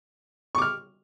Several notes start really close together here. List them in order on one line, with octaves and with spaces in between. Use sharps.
C#6 D6 F6